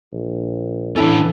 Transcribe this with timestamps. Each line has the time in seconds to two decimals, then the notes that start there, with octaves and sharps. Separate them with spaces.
0.12 A#1
0.96 E3 C#4 D4 E4 A4